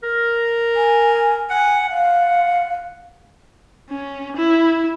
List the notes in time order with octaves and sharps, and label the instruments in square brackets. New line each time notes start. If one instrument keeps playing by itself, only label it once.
[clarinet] A#4
[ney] G#5
[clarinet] F#5 [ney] G#5
[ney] F5 [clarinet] F#5
[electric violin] C#4
E4